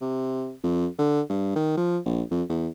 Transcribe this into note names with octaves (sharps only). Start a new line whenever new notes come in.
C3
F2
D3
G2
D#3
F3
A#1
F2
E2